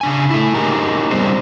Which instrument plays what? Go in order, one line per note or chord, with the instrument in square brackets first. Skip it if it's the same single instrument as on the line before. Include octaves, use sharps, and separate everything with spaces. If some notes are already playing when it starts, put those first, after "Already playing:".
[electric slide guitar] C#3 D4 G#5
A3 E4
D#4 G4 G#4 A#4
G3 B3 C4 D4 A#4 C5